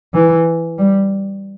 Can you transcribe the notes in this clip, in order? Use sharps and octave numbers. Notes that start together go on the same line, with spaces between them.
E3
G3